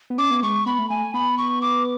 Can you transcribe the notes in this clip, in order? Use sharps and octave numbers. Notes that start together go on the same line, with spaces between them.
B3
C#4 D6
B3
G#3 C#6
B3 B5
A3
A3 G#5
B3 B5
C#6
D6